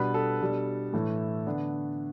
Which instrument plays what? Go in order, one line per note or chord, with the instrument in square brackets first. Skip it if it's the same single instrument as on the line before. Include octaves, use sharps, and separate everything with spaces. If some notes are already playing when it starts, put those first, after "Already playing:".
Already playing: [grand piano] B2 G3 B3 D4 B4
A4
B2 G3 D4
A2 E3 A3
D3 B3 D4